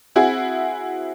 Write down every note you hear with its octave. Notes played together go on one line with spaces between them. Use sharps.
C4 E4 F#4 G#4